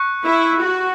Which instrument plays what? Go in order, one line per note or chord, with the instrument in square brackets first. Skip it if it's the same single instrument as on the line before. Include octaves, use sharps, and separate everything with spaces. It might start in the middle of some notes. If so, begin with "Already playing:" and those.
Already playing: [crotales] C#6 F#6 C#7
[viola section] E4
F#4